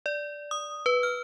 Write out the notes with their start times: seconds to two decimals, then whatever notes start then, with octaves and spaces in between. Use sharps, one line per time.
0.06 D5
0.51 D#6
0.86 B4
1.03 F6